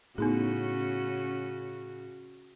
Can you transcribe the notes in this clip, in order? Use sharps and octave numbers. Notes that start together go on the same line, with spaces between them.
A2 C#3 B3 C#4 D#4 F#4 G#4